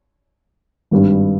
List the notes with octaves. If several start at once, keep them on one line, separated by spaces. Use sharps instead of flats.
G#1 G2 G3